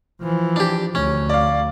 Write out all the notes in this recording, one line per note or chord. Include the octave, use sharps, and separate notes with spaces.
E3 F3
D4 G4
D2 C#4
D5 F5